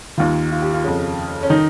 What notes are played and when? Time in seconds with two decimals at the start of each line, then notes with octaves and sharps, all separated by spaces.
0.18 D#2 D#3 F4
0.51 F4
0.62 G4
0.73 F4
0.84 F2 C#3
1.43 C#4
1.50 D#3 D#4